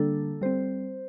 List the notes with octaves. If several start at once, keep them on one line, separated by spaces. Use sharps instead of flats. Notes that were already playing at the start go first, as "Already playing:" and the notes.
Already playing: D3 G3 A#3 D4 A4
G3 C4 C5